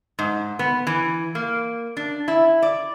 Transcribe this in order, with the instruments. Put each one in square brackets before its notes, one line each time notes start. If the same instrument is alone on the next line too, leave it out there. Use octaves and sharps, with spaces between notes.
[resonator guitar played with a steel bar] G#2
B3
E3
A#3
D4
E4
D5